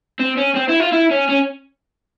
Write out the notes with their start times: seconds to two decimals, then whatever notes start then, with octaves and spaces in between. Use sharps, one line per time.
0.19 C4
0.37 C#4
0.55 C4
0.69 E4
0.80 F4
0.92 E4
1.11 C#4
1.29 C#4